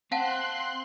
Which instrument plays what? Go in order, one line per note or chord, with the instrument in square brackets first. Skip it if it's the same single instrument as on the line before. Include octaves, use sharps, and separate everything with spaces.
[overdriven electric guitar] C4 [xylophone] F5 F#5 A5 [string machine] C6 F#6